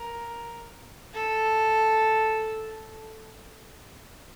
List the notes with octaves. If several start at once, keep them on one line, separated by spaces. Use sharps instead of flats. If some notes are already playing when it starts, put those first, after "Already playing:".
Already playing: A#4
A4